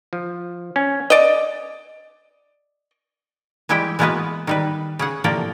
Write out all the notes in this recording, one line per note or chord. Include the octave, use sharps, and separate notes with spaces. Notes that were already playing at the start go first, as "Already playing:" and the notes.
F3
C#4
D5 D#5
E3 G3 G#3 E4 G4 G5
E3 G#3 A#3 B3 F#4 B4
D#3 G3 B4
C#3 G#4 F#5
A2 C3 F3 A#3 D5 G5